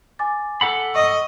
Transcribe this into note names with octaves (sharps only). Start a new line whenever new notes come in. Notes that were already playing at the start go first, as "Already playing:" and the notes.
G#5 D6 A6
A4 F#5 B5
D#5 C#6